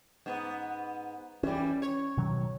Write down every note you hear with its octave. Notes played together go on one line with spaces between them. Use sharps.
G#2 B3
E3 G3 C#4
C#5
B2 D#3 F#3